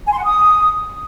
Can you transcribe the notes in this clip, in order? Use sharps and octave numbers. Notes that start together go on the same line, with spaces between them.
G#5
C6
F#5
D#6